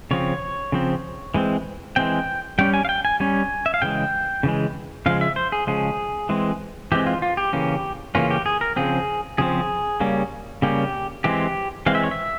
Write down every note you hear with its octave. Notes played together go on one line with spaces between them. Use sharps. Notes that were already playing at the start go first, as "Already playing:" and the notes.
C#3 F3 C4 C#5
C#3 F3 C4
E3 G#3 C4
E3 G#3 C4 G5
G3 C#4 G5
G#5
F5
G5
G#5
G3 C#4 G#5
E5
F5
C#3 E3 G#3 G5
C#3 E3 G#3
C#3 F3 G#3 F5
E5
C5
G#4
C#3 F3 G#3 G#4
E3 G#3 C4
E3 G#3 C4 G4
F4
F4
G4
C#3 E3 A#3 C#4
C#3 E3 A#3 C#4 F4
G4
G#4
A#4
C#3 F3 C4 G#4
C#3 F3 C4 G#4
C#3 G3 A#3 C#4
C#3 G3 A#3 C#4 G4
E3 G#3 C4 G4
E3 G#3 C4 F5
E5
C#5
E5